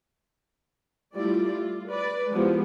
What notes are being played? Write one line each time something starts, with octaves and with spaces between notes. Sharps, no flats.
G3 A3 E4 F4 D5
F4
B4 D5
F3 G#3 B3 E4 G4